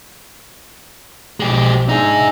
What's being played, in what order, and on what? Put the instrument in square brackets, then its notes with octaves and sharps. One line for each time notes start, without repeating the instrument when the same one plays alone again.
[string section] B1 F3 [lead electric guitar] G#3 G4
[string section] D4 E5 [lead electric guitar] D#4 G#4